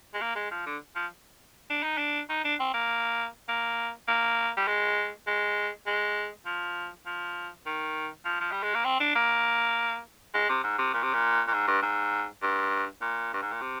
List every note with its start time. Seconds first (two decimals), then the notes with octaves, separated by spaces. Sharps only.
0.14 G#3
0.21 A#3
0.36 G#3
0.51 F3
0.66 D3
0.96 F3
1.70 D4
1.83 D#4
1.97 D4
2.29 D#4
2.44 D4
2.60 C4
2.74 A#3
3.48 A#3
4.08 A#3
4.57 G3
4.68 G#3
5.27 G#3
5.87 G#3
6.46 F3
7.06 F3
7.66 D#3
8.25 F3
8.41 F3
8.52 G3
8.63 G#3
8.74 A#3
8.85 C4
9.00 D4
9.15 A#3
10.34 G#3
10.49 C3
10.63 G#2
10.79 C3
10.94 A#2
11.03 C3
11.13 A#2
11.48 A#2
11.53 G#2
11.67 G2
11.82 G#2
12.42 G2
13.02 A#2
13.33 G2
13.42 G#2
13.52 A#2
13.61 C3